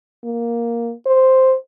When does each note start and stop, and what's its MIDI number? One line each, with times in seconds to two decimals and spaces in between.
0.24 0.92 58
1.06 1.55 72